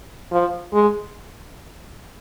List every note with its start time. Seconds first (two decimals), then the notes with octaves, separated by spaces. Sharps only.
0.32 F3
0.74 G#3